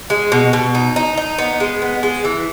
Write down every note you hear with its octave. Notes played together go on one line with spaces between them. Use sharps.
G#3
B2
B2
D#4
D#4
D#4
B3
G#3
B3
G#3
E3